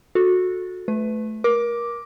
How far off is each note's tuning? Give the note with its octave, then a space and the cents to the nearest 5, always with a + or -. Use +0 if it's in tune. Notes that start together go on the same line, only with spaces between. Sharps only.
F#4 -20 A4 +0
A3 -15 B4 +20
A#4 +25 D6 +0